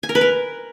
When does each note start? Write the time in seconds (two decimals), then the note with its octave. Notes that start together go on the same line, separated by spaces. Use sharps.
0.03 G#5
0.09 A#4
0.15 B4
0.21 A#4